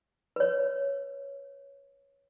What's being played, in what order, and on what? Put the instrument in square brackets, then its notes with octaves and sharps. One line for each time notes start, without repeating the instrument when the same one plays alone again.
[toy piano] B4 C#5